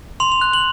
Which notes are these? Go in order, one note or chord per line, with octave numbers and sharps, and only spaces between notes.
C6 F7
F7
F#6
F#7